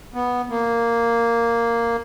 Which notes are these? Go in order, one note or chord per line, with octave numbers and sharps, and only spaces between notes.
B3
A#3